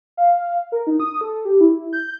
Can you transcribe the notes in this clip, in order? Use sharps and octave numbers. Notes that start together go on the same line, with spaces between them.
F5
A#4
D#4
D#6
A4
G4
E4
G6